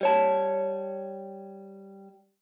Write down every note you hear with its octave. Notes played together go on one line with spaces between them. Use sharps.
G3 C#5 A5